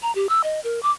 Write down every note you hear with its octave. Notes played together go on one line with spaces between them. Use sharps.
A#5
G4
E6
D#5
A#4
D6